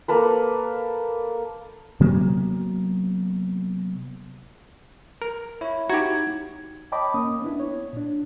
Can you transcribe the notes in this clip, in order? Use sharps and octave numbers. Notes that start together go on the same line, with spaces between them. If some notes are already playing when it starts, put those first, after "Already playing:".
A#3 A4 B4
C3 F#3 A#3 B3
A#4
E4 C#5
D#4 F#4 G4 A#5 G#6
C#5 D#5 G5 A5 B5 D6
A#3 C#4 D#6
B3 D4 E4
C#5
A#2 D4